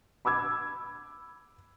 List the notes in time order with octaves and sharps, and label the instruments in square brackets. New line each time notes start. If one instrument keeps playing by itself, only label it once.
[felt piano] B5 D6 E6 G#6